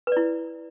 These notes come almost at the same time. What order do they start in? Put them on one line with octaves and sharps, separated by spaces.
B4 D5 E4